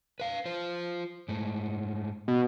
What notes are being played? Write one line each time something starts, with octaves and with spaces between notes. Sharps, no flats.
B4 F5
F4 C5
G#2 A3
B2